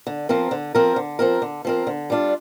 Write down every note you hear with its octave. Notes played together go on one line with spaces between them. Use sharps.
D3
F3 C4 A#4
D3
F3 C4 A#4
D3
F3 C4 A#4
D3
F3 C4 A#4
D3
G3 D4 F4